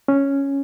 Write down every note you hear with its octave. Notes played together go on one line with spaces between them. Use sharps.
C#4